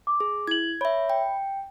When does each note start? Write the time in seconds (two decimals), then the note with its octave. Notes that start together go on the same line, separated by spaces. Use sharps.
0.07 D6
0.20 G#4
0.47 E4 G#6 F#7
0.81 C#5 E5 B5
1.10 G5